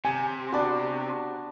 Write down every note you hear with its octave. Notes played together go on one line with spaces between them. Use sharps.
C3 G#5
B3 D4 F#4 D5